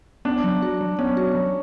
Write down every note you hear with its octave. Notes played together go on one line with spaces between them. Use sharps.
B3 D4
F#3
F#4
F#3
B3 C#4
F#4
F#3